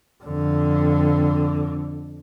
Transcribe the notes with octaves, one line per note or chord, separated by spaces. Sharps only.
F2 D3